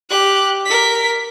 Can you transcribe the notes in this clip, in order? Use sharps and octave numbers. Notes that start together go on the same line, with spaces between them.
G4 F#6
A#4 B6